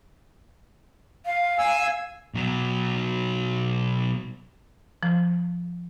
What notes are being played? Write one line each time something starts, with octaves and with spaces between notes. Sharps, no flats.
F5
G#5 E6
B2 F#3
F3